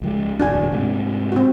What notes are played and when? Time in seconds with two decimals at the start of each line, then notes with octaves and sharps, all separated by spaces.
0.02 C#2 F3 G#3
0.40 D1 A#1 E2 D4 F#4 G#5
0.72 G#2 C3 A3
1.32 C4 F#4